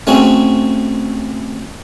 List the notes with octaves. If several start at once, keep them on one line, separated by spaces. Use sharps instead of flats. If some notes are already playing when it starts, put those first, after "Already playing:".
A3 C4 C#4 F#4 G#4